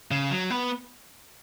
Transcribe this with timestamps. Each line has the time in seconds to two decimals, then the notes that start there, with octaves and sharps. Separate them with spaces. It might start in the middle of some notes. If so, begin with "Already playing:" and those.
0.11 C#3
0.31 F#3
0.50 B3